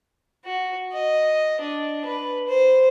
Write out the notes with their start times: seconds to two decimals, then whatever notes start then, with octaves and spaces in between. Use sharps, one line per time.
0.46 F#4
0.93 D#5
1.61 D4
2.05 B4
2.48 C5